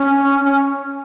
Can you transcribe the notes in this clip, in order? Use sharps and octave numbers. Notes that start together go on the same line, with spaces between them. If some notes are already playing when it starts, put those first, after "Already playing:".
Already playing: C#4
C#4